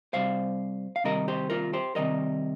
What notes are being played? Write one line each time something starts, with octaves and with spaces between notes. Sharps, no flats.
C3 G3 C5 F5
F5
C3 D#3 G3 A#4 D#5
G4 C5
F4 A#4
G4 C5
C3 D#3 G3 A#4 D#5